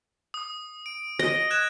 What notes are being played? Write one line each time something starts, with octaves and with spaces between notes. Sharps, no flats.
D#6
D7
D#5 D7
F#6 G#6 E7